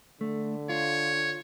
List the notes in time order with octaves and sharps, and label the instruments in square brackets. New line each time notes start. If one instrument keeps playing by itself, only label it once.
[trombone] D3 [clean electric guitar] A3
[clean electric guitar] F4 [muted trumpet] C#5